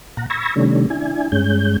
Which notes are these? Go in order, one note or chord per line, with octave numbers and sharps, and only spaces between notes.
A#2 F#5 A#5
B5 C#6 E6 G#6 A#6
C3 D#3 G3 A3 C#4 D4
D4 E4 G#5
G2 G#3 C#4 G6